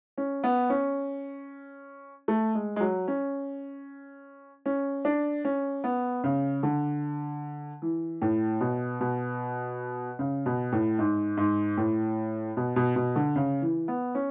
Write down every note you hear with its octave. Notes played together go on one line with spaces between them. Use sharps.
C#4
B3
C#4
A3
G#3
G#3
F#3
C#4
C#4
D4
C#4
B3
C#3
D3
E3
A2
B2
B2
C#3
B2
A2
G#2
G#2
A2
B2
B2
B2
D3
C#3
E3
B3
C#4